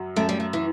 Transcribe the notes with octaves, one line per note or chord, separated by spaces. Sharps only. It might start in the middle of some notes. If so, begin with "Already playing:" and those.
Already playing: F#2 F#3
F#2 A3
G3
A3
E3